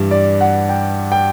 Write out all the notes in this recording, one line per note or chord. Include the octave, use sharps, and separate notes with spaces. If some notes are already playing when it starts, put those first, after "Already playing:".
Already playing: G2 E3 G3
D5
F#5
G5
G5